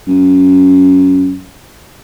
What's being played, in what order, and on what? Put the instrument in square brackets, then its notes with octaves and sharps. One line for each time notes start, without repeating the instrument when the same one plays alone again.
[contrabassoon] F#2